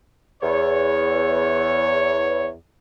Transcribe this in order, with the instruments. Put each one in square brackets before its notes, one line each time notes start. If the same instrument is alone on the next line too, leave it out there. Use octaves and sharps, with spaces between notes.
[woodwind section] E2 [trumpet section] C#5